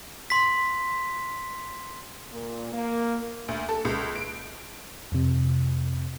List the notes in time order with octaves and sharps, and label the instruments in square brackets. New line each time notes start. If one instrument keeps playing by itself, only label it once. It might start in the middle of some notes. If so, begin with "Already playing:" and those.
[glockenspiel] C6 B6
[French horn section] A#2
A#3
[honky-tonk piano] D2
A4
C#2
D7
[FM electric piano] F2 C3